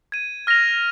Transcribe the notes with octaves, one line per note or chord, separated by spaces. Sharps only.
G#6 D#7
F6 A#6 F7